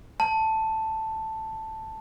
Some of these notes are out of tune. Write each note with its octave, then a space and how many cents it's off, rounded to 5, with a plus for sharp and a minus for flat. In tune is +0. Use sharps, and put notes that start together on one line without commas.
A5 +5